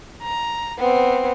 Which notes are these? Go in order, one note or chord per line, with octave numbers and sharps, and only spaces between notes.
A#5
B3 C4